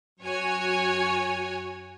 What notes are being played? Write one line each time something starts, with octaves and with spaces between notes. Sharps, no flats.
F#2 F#4 C#5 G#5